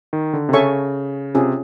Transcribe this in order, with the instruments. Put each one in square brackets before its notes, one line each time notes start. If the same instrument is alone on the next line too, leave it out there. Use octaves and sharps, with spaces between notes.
[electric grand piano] D#3
D3
C3
[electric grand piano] C#3 [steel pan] A4 C#5 E5 G#5 C#6
[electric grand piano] C3 [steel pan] C#4 F4 G#4